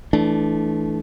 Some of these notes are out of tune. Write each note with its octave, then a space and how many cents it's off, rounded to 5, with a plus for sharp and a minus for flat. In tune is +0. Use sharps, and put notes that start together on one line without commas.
E3 -20 A3 -20 D4 +0